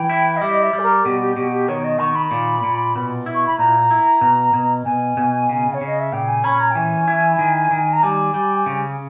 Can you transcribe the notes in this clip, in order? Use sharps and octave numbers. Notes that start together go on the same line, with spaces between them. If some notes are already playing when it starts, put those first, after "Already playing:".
Already playing: E3 G5
E4
D#5
G3 E5
D#5
E5
G3
G#4
A#4
B2 G4
G4
B2 G4
G4
D#3 C#5
D#5
D#3 C#6
B5
A#2
A#2
B2
E4
C#6
B5
A#2 A#5
E4
B2
B2
B2 G#5
B2
C#3
C#5
C#3
D#5
E5
A#2 G5
G#5
C#4 B5
A#5
G5
E3 G#5
E4
D#3
D#3
A#5
G3 G#5
G3
C#3